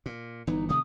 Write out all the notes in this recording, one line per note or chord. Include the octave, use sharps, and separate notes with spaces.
A#2
G1 E3 B3 D#4
C3 D#3 A3 D#6